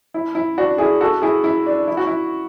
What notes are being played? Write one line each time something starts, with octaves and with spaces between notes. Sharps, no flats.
E4
E4
D4 F#4
E4 G#4
F#4 A4
E4 G#4
E4
D4
E4
F#4
E4